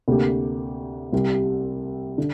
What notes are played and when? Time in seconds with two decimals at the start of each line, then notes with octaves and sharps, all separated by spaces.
0.08 D2 C3 A#3 G4
1.13 C2 C3 G3
2.18 D3